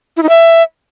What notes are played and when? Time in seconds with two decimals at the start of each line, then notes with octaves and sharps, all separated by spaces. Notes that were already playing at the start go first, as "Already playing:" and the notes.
0.17 E4
0.23 D#4
0.29 E5